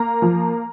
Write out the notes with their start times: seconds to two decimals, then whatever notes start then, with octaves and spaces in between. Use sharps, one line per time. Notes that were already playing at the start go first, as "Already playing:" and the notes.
Already playing: A#3 A#5
0.22 F3